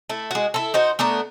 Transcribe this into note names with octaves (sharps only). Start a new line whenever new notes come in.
A3 E4
G#3 F#4
E4 A4
D#4 F#4 C5
A3 B3 D4 A#4